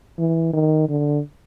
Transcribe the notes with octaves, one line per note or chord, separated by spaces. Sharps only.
E3
D#3
D3